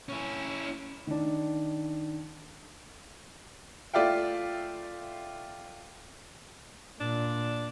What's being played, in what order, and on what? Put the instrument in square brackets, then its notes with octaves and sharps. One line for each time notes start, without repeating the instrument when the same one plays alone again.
[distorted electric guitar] C#4 E4
[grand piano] D#3 D4
[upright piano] A3 F4 D5 E5 F5 G5
[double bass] A#2 [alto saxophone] D4